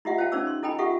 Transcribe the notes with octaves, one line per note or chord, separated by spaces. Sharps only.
E4 F4 G4 D#5 E5 F#5
C5 F5 G5 A5
C#4 D#4 C5 C#5 D6 E6
C6
E4 A4 D#5 G5 G#5 B5
F4 G4 A4 E5 F#5 C#6